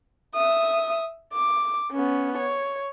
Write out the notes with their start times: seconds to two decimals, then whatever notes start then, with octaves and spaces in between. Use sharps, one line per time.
0.35 E5 D#6
1.33 D6
1.92 B3 C#4
2.38 C#5